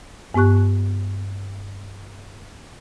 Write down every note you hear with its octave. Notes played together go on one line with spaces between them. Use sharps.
G2 B3 G4 C#6 F#6